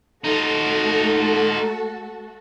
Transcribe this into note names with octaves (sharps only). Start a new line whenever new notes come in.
A3 D#4 F4 F#4 A4